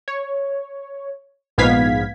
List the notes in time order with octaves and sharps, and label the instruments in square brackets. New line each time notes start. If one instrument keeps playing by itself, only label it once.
[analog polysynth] C#5
A#1 G#2 B3 F5 G#6 B6